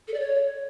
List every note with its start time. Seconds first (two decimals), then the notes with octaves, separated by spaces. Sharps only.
0.08 A4
0.14 D5
0.20 C#5